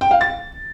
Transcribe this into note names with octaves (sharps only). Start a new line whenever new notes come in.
G5
F5
A6